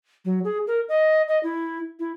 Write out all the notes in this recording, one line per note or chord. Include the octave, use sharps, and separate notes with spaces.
F#3
G#4
A#4
D#5
D#5
E4
E4